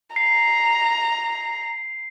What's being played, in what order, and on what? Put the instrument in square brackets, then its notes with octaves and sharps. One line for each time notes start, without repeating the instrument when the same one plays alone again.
[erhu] A#5 [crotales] C7